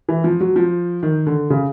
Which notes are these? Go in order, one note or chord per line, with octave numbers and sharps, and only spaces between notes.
E3
F3
F#3
F3
D#3
D3
C#3